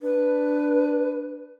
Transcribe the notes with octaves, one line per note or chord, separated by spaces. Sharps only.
D4 B4